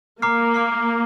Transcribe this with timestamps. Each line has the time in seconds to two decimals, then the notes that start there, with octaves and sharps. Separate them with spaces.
0.22 A#3 A#5 D6 F6 C7
0.54 A#5 D6 F6 C7